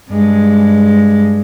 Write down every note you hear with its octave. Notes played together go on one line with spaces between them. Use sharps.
G2 G#3